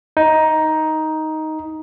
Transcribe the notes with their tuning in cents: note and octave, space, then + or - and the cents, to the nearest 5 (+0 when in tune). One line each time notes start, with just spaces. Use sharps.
D#4 +10